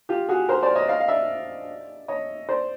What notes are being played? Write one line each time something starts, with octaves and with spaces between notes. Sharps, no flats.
F4 G4
F#4 G#4
A#4 C5
C5 D5
C#5 D#5
D#5 F5
F5
D5 E5
C#5 D#5
C5 D5